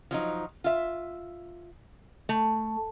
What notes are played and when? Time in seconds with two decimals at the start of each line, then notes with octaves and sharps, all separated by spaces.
0.11 F3 F#3 D#4
0.64 F4 E5
2.29 A3